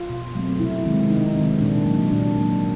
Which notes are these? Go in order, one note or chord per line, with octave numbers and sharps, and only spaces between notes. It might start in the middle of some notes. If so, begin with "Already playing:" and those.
Already playing: F4
B2
F#3 A3 C4
C3 E4
D#3 G#3 C4
C3 D#4
D#3 G#3 C4
A#2 D4
F#3 A#3
A#2 D4
F#3 A#3